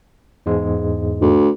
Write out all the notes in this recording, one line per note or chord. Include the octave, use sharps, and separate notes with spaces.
E2 G#2 G#3
D2